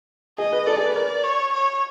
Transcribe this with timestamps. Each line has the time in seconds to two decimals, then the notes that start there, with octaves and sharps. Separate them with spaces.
0.38 G#4 D#5
0.52 B4
0.66 A4 D5
0.77 G#4
0.86 B4
0.96 A#4 D5
1.24 C#5
1.53 C#5